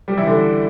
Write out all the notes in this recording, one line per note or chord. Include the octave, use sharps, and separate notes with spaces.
G3 G4
E3 E4
D3 D4